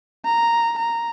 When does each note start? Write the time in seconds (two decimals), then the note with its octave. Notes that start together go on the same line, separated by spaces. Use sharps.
0.25 A#5
0.79 A#5